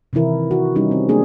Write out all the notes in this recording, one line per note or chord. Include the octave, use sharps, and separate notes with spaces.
C3 D#3 E3 E4 A#4
F#4
G3 C#4 D#4 F#4 G4
C4
G#3 A#3 D4 G#4